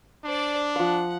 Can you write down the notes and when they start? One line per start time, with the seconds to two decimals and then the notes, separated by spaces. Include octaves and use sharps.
0.24 D4 C5 D5
0.76 F3 F5 F#5